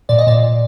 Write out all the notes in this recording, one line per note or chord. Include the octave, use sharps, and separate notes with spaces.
A#2 D5
D#5
A#2 D5
A#2